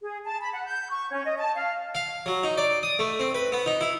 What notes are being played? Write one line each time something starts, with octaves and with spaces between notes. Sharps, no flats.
G#4
A5
B5
F#5
G6
C#6
C#4
D#5
A5
F5
F5
F#3
D#4
D5
D#6
A3
C4
B4
B3
D#4
E4